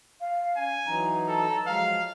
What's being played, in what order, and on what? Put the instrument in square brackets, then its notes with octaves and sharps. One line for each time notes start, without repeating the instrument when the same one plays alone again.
[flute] F5
[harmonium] C#4 [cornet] G#5
[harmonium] E3 F#3 D#4 [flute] A#5
[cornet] A4
[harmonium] F3 F#3 G#3 [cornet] F5